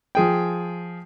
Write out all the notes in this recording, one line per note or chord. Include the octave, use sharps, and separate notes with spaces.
F3 G#4 G5